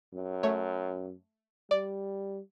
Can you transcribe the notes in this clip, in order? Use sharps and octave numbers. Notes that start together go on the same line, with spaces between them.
F#2
A3 C#5
G3 D5